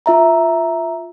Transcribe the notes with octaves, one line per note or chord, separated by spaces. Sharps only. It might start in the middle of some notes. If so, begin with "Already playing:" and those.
F4 E5 A#5